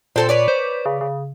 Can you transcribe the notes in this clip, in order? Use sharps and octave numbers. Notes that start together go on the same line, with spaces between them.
A#2 C4 A4 C5
B4 C#5 D5
C5
C#3
C#3